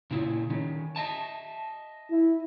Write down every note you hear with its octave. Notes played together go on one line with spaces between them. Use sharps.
A#2 C#3 E4
D#3 C#4
D#5 E5 A5
E4